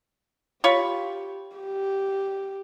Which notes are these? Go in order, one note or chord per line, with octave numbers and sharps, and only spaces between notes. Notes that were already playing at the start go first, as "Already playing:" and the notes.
F4 G4 C#5 B5
G4